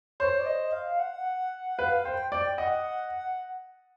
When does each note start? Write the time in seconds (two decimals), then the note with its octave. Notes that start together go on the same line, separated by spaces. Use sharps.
0.20 C5 C#5
0.39 D5
0.46 D#5
0.72 F5
1.00 F#5
1.78 B4 F5
2.05 C5 G5
2.31 D5 G5
2.58 D#5 F#5